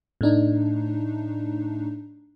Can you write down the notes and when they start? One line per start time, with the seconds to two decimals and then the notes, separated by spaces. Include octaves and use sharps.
0.21 A2 A3 D4 D#4